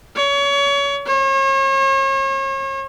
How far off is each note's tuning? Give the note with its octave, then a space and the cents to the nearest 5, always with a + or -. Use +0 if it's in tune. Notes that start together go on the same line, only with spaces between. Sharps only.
C#5 +30
C#5 -40